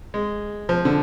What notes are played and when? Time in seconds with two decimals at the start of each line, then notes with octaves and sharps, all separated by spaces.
0.14 G#3
0.69 F3
0.85 D3